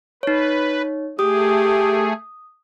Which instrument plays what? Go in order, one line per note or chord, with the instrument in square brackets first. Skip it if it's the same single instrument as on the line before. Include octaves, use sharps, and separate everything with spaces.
[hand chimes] D#4 C#5 [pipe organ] B4
[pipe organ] A3 G#4 [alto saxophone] G4 [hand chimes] D#6